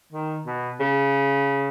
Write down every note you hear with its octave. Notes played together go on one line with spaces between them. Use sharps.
D#3
B2
C#3